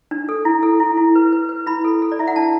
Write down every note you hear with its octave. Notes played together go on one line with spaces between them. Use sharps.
D4
A4
E4
A4
E4
E4
B4
B4
B4
E4 B5
A4
A4
D5
E4 E5
F#5
D4 A5